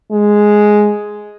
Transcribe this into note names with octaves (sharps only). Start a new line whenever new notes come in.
G#3